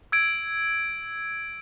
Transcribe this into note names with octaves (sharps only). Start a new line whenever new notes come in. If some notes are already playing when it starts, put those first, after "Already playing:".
E6 G#6 D7